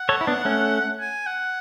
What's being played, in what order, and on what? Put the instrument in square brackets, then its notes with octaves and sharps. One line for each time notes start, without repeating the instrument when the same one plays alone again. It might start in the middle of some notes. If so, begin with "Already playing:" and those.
Already playing: [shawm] F#5
[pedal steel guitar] A4 C#5
E4
B3 D4
A3 C#4
[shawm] G#5
F#5